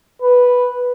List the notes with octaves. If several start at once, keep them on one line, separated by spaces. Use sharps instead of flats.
B4